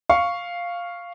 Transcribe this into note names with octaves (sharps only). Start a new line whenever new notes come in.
F5 C#6